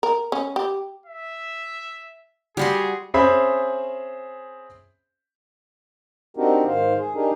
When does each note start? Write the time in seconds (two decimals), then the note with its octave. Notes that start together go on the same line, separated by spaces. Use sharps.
0.03 A#4
0.32 C#4
0.56 G4
1.06 E5
2.57 G3 F#4 G#4 C6
3.14 C4 C#4 G#4 C5 E5 B5
6.37 C4 D4 D#4 F#4 G4 A#4
6.67 G#2 D#3 C5 F5
6.98 G#4
7.15 D4 D#4 G4 G#4 A#4